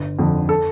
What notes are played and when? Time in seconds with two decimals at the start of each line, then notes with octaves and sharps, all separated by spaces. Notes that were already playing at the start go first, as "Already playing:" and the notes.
Already playing: G1
0.19 F2 D3
0.49 A4